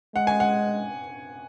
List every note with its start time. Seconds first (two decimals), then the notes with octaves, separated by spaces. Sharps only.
0.15 G#3 F#5
0.27 G#5
0.40 F#5